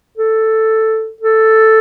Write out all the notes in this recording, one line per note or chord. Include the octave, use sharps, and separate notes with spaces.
A4
A4